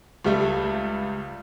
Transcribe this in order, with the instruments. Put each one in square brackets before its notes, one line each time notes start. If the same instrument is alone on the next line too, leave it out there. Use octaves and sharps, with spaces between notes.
[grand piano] C#2 G3 A3